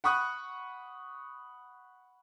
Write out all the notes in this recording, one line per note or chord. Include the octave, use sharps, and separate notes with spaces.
F#5 B5 C#6 D#6 F#6